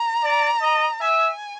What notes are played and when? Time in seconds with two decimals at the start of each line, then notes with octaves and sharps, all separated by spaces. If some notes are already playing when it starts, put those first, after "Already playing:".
Already playing: A#5
0.24 D5
0.61 D#5
1.01 E5 G#5